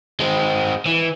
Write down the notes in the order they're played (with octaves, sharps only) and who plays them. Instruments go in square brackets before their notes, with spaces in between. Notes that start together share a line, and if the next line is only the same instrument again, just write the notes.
[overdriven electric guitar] G#3 C4
E3